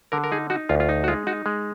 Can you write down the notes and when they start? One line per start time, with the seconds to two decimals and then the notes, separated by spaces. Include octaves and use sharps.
0.12 D3 A#4
0.24 A#4
0.32 D#4 G#4
0.50 D#4 F#4
0.69 D2 F4
0.80 F4
0.89 D#4
1.04 F#4
1.08 G#3 F4
1.27 D#4 F#4
1.46 G#3